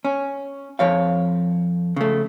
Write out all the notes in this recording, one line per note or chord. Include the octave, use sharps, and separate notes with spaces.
C#4
F2 F3 C#5 F5
C#3 A3